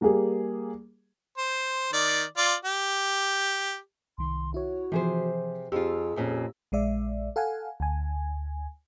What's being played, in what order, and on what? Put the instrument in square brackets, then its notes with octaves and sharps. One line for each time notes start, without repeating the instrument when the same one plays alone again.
[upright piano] G3 A#3 G4 G#4
[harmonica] C5
D#3 D5
F4 D5
G4
[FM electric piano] C2 D#3 [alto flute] C6
[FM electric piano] E4 C#5 [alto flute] F#4
[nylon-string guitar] C3 G#4 C5 [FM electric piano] E3 F3
[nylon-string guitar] F2 F4 [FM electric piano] G4 E6 [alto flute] G#4
[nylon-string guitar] F2 A#2 C#4
[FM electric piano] A#1 G#3 D5 E5
A4 F5 F#5 G#5
D2 G#5